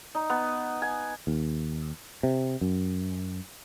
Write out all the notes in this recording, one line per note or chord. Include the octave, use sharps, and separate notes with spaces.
D#4
B3
G#5
D#2
C3
F#2